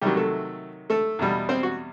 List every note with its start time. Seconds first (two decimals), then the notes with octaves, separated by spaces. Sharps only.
0.01 C3 D#3 F#3 G3 G4
0.17 A3 A4
0.90 A3 A4
1.19 E2 B2 G3
1.49 C4 C5
1.63 F#4